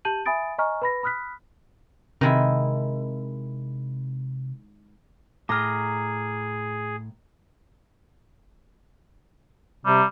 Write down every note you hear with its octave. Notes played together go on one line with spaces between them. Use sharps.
G4 A5 G6 D#7 F#7
E5 G#5 B5 D#6 A6 D7
D#5 G#5 A#5 C#6 F6
B4 B5 A#6
B5 D#6 F6 F#6 B6
C3 D#3 G#3 E4
A2 G#4 A#5 D6 F6
C3 G3